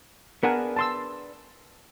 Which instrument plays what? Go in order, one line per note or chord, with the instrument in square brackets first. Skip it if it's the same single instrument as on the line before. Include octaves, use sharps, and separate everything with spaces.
[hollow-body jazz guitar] B3 D4 G#4 [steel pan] A#4 F#5
[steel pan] A5 C6 E6